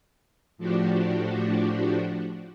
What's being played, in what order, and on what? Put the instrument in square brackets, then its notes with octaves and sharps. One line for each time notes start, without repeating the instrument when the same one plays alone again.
[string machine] A2 F3 D4 F#4 G4